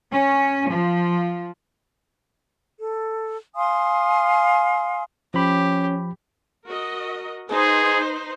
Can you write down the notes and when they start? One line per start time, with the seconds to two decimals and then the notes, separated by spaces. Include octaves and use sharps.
0.12 C#4
0.70 F3
2.78 A4
3.55 F5 G#5 C6 D#6
5.34 F3 C#4 G4 B5
6.66 F#4 A#4 D#5
7.50 D#4 G#4 B4 C5